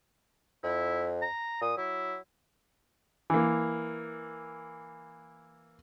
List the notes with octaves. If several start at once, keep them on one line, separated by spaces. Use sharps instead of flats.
F2 E4
A#5
A#2 D#6
F#3 E4
E3 A#3